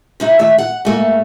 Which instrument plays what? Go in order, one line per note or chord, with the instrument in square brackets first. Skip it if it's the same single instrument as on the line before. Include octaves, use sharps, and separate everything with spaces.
[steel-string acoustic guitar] C3 D#4 E4
D#3 A3 E5
F#5
G#2 A3 A#3